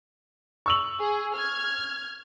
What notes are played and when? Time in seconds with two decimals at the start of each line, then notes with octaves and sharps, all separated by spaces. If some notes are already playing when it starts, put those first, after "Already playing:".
0.66 C#6 E6 F#7
1.00 G#4
1.35 F6 G#6